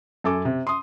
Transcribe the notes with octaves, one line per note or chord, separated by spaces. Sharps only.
F#2 A4 G#5 D6
C3
C6 D#6